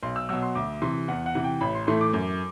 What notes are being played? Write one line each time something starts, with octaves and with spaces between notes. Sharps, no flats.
B1 C6
E6
B2 F#3 E6
C6
D2 D6
C3 E3 C6
E2 F#5
F#5
C3 E3
G5
A1 B5
C6
A2 E3 A3 C6
D6
F#2